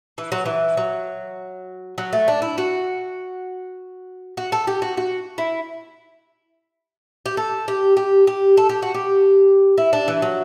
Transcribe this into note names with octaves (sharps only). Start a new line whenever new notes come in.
E3
F#3
E3
F#3
F#3
A3
D4
E4
F#4
F#4
A4
G4
F#4
F#4
E4
G4
A4
G4
G4
G4
A4
G4
F#4
G4
E4
D4
E3
F#3